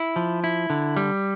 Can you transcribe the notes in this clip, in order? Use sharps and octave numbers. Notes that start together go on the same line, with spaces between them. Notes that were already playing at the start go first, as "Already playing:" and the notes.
Already playing: E4
F3
E4
D3
G3